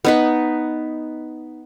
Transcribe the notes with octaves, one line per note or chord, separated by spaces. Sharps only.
B3 D#4 B4